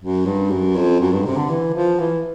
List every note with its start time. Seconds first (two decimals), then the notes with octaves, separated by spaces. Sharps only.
0.01 F#2
0.25 G2
0.50 F#2
0.76 F2
1.00 F#2
1.12 G2
1.25 C3
1.37 D3
1.50 E3
1.74 F3
1.99 E3